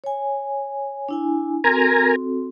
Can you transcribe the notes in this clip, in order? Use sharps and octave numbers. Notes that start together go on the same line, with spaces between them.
C#5 G#5
D4 E4 G#5
C4 F#4 A4 A#4 G#5 A#5